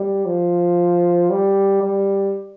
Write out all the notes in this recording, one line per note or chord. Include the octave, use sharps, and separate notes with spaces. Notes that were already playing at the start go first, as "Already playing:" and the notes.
Already playing: G3
F3
G3
G3